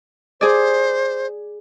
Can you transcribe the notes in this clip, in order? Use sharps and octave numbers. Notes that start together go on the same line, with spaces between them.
G#4 C5 D5